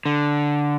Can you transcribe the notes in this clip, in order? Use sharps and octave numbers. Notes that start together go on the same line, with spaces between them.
D3